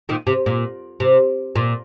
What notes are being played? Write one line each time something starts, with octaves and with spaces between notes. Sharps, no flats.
A#2 D#3
C3
A#2
C3
A#2